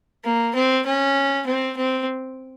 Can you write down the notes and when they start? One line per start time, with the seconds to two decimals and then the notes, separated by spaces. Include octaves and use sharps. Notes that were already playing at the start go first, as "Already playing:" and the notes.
0.24 A#3
0.55 C4
0.85 C#4
1.46 C4
1.77 C4